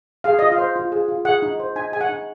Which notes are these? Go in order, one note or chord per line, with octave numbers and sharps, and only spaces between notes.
G#4 F5
F4 D#5
F5
C5
F4
G#4
F4
G#4 F#5
D#4
C5
D#4 G#5
G#4 G#5
F#5
D#4